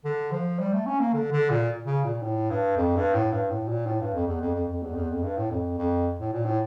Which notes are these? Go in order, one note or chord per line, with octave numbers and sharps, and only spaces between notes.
D3
F3
G3
A3
C#4
A#3
D3
D3
A#2
C#3
A#2
A2
G2
F2
G2
A2
G2
A2
A#2
A2
G2
F2
E2
F2
F2
F2
E2
F2
E2
F2
G2
A2
F2
F2
A2
A#2
A2